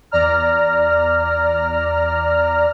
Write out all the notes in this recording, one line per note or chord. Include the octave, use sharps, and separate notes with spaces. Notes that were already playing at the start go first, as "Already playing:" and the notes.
E2 D5 A#5 F6